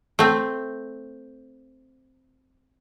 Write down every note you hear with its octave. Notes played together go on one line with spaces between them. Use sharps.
A3 C4